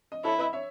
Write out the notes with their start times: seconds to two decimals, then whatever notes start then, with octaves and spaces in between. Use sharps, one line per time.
0.12 D#5
0.24 E4 A4 C#5
0.38 B4 D#5
0.53 C#5 E5